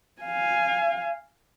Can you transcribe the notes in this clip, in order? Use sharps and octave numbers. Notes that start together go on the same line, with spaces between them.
F5 G#5